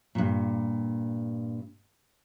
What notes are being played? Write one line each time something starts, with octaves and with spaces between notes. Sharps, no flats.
G2 A#2